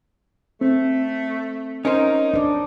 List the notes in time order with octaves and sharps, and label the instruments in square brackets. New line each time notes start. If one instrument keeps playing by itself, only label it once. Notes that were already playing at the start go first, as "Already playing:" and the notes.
[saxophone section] A3 [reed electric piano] C4
[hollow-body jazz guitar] C#4 A#4 C5 [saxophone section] D#4
[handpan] D4 D5